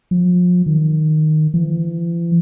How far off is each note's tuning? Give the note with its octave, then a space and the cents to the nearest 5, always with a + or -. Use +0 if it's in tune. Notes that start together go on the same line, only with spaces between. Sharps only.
F3 +35
D#3 -10
E3 +45